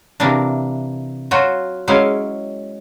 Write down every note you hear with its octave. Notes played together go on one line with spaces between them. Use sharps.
C3 E3 A#3 D4
F#3 F4 F#4
F#3 G#3 C#4 E4 F5